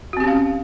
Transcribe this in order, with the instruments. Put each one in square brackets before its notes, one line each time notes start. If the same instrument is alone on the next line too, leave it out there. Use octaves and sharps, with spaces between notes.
[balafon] F#4
C4
G4
C#4
F5